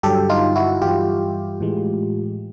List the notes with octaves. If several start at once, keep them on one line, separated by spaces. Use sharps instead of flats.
G2 D3 F#3 G4 A4
D#4 F4
E4 F#4
G2 E3 G3 F4 G4
A2 E3 G#3